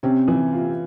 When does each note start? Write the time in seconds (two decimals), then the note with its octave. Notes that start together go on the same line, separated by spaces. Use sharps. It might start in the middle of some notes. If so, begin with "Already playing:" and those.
0.03 C3 C4 C#4
0.28 E3
0.53 F4